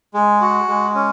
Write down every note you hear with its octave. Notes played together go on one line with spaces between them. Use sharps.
G#3
F#4
G#3
C#4